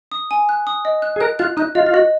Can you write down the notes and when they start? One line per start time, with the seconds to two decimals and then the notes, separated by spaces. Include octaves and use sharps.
0.12 D#6
0.31 G#5
0.49 F#6
0.67 D#6
0.85 D#5
1.02 F#6
1.16 G#4
1.20 A#4 F#6
1.39 F4 F#6
1.57 D#4 F#6
1.75 F4 D#5
1.86 F4
1.94 F#4 D#5